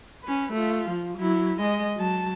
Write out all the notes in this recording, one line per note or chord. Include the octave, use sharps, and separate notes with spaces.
C#4 B4
A3 F4
F3
F#3 E4
G#3 D#5
F#3 A5